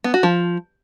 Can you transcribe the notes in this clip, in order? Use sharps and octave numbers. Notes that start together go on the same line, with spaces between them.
B3
F#4
F3